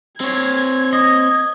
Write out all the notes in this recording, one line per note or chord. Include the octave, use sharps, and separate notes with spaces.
C4 C#5 G#6
D#5